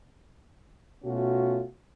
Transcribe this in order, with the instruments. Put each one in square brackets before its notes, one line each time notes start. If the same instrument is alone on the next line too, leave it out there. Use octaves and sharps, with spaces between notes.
[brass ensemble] B2 A3 C#4 F4 F#4